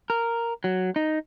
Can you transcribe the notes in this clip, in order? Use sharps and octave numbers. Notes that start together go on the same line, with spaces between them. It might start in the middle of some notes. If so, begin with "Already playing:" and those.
A#4
F#3
D#4